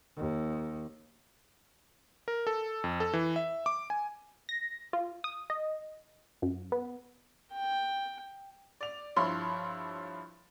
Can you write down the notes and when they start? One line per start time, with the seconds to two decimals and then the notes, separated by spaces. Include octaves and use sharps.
0.16 D#2
2.28 A#4
2.47 A4
2.84 F2
3.00 A4
3.13 E3
3.36 E5
3.66 D6
3.90 G#5
4.49 A#6
4.93 F4
5.24 D#6
5.50 D#5
6.42 F#2
6.72 B3
7.53 G5
8.81 D5 F7
9.16 G2 F3 E4 C#5 B5 C6